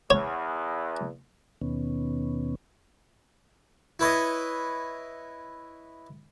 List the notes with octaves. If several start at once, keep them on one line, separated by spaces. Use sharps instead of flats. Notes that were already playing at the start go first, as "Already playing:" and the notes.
E2 C#5
D#2 B2 D#3 B3 C#4
E4 B4 C#5 D#5